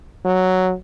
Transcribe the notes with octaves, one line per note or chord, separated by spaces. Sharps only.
F#3